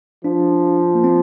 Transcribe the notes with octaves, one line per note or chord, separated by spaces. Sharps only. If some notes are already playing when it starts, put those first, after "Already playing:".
F3 D4
A#3
C4